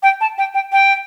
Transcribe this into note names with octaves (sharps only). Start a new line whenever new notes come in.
G5
A5
G5
G5
G5